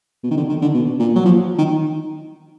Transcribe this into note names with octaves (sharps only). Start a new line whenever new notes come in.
B2
D#3
D3
D#3
D3
B2
A#2
F#3
F3
D#3